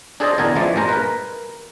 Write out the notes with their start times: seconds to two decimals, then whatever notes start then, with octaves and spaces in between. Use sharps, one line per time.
0.20 D4 G#4 A4 C5 D5 D#5
0.38 A1 E2 D3 A#4 D#5 G#5
0.55 A1 E3 F3 G#3 A3 D5
0.76 G2 A#2 G#3 C5 A#5
0.89 A#4 B4